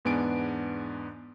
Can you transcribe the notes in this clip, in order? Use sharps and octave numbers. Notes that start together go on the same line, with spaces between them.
E2 G#2 B3 D4 G#5 D7